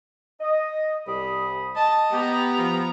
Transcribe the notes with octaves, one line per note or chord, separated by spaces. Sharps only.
D#5
C2 G3 B5 D#6
D#5 A5
B3 G4 A#5
F3